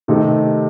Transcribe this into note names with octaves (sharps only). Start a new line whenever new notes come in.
C3 D#3 A3 C4 D#4